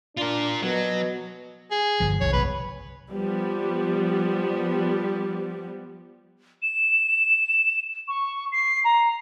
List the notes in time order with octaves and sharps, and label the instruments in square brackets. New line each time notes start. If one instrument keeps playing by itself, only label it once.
[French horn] D4 [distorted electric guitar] F4 A#4
[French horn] B2 [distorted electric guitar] F#3
[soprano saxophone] G#4
[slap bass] G1 F3
[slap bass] F1 C2 D#3 [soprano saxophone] C#5
[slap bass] F1 B1 [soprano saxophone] B4
[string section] F3 G3 B3
[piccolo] E7
C#6
C7
A#5